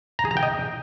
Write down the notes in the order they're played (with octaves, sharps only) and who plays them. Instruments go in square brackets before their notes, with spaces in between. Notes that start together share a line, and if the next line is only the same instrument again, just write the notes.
[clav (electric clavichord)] A#5
G#4
A#5
G5
D#5